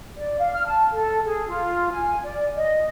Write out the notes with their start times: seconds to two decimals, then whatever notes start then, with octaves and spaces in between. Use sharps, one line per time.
0.18 D5
0.39 F5
0.53 F6
0.66 A5
0.93 A4
1.25 G#4
1.48 F4
1.93 G#5
2.24 D5
2.56 D#5